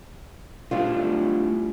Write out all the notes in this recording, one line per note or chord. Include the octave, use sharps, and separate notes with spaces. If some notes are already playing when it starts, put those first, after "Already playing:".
G3 A3 D4 E4 F4